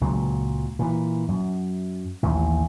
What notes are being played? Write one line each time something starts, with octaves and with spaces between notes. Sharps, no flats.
C#2 A#2 F#3
A#2 E3
F#2
A1 D#2 A3